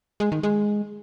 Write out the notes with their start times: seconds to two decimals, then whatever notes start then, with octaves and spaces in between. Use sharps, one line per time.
0.20 G#3
0.32 D#3
0.43 G#3